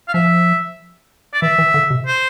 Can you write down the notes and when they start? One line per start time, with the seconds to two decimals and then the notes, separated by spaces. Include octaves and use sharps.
0.08 F5
0.13 F3 E5
1.34 D5
1.42 E3 E5
1.58 E3
1.74 D3
1.90 C3
2.07 C5